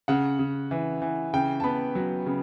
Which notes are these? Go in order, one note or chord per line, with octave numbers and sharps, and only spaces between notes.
C#3 F#5
C#3
E3
E3
C#3 G5
A5
B3 B5
F#3
C#3